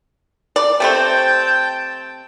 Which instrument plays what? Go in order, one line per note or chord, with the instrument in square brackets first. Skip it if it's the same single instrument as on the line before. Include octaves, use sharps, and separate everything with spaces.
[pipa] D5
[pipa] C3 A3 C4 [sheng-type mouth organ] G5 A5 G6